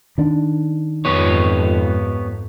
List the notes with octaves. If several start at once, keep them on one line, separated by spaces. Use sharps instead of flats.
D#3 D4
F2 G#2 B3 G4 C#5